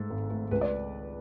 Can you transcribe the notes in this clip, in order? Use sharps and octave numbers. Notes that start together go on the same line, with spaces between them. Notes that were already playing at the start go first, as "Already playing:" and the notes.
Already playing: G#2 A3 A4
G#1
A3
C#2 B4
D5